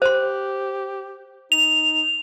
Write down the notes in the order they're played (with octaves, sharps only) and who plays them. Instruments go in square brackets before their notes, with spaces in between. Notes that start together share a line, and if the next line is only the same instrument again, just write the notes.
[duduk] G4 [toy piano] C5 C6
[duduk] D#4 [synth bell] F7